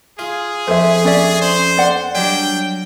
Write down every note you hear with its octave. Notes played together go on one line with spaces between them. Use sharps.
F4 G#4
F2 C5 E5
C#4 D5 E5
C5
D5 F#5
F#3 G3 D4 G5